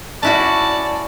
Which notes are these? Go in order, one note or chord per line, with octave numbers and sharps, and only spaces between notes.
C#4 E4 F#4 D5 A5